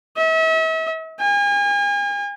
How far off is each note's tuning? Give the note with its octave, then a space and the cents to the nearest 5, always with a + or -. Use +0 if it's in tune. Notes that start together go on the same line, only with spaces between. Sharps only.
E5 -40
G#5 -40